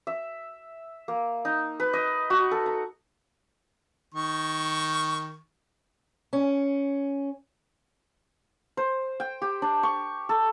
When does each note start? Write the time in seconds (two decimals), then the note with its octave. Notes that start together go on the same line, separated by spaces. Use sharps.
0.07 E5
1.08 A#3
1.45 D#4
1.80 B4
1.93 D#5
2.30 F#4
2.51 A4
2.66 A#5
4.14 D#3 C#6
6.33 C#4
8.77 C5
9.20 G5
9.42 G4
9.62 D4
9.83 C#6
10.29 A4